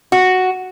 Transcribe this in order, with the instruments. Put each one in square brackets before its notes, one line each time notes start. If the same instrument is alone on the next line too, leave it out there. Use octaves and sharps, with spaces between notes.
[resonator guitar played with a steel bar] F#4